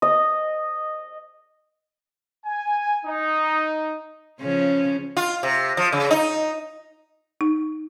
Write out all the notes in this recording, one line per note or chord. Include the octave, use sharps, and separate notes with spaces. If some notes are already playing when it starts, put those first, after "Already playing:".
D#5
G#5
D#4
C#3 F3 C#4
F4
C3
F3
C#3
D#4
D#4